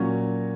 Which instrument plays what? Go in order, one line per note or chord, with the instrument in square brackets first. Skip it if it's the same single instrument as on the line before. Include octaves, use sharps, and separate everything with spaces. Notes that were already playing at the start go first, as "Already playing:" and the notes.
Already playing: [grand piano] A#2 F#3 C#4 F#4